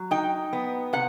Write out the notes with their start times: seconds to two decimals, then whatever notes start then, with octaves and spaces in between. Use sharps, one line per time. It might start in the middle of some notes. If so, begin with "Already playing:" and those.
Already playing: F#3
0.11 D#4 G5
0.53 B3
0.93 C3 F#5